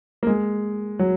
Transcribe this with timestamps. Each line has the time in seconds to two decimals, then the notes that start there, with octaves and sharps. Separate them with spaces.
0.23 A#3
0.27 G#3
0.99 F#3